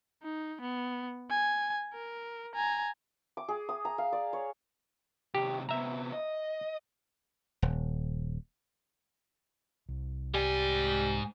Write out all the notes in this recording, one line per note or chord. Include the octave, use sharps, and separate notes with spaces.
D#4
B3
G#5
A#4
G#5 A#5
D6
G#4
D#6
A#5
F5
D5
C#5
C3 D#3 G4
C3 B3 E5 A#5
D#5
D#1
C2
G#2 G3 G#5